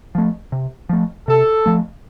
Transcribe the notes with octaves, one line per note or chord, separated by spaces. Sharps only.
F3 A3
C3
F3 A3
C3 A4
F3 A3